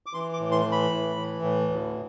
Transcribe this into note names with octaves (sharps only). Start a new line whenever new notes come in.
D6
E3 C6
D6
A2
C6
E3
B5
A2
E3
A2
D2